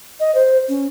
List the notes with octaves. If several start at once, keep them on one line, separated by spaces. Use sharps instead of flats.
D#5
C5
C#4